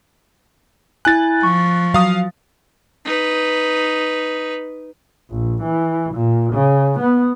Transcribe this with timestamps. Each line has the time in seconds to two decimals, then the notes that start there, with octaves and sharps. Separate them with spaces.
1.05 E4 G#5 F#6 A6
1.43 F3 C#6
1.94 F#3 F5 D#6
3.05 D#4 B4
5.30 A#1
5.62 E3
6.13 A#2
6.52 C#3
6.99 B3